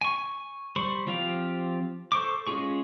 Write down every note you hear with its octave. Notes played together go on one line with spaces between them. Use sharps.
G#5 C#6
G3 C5 B5 C#6
F3 C4 F4 G4 F5
A4 C5 C#6 D6
G#3 C#4 F4 G#4 C#6